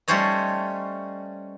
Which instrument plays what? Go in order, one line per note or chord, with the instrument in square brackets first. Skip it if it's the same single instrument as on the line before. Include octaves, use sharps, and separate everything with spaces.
[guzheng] G3 A3 C#4 C5 C#5 D#5